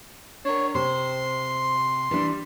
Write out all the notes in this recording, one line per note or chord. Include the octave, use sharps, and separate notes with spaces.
D4 A#4 C#5
C3 C5 C6
E3 G3 D4